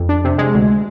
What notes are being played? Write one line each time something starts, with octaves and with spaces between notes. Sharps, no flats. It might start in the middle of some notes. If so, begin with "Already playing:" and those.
Already playing: F2
D4
C3
G#3
D2